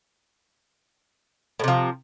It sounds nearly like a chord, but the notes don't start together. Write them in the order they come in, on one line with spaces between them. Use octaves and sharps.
A2 C3 F3